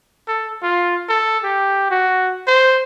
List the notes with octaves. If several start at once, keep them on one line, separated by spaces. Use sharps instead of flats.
A4
F4
A4
G4
F#4
C5